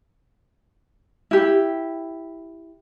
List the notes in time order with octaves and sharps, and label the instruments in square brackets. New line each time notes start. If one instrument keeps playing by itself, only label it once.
[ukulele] E4 G4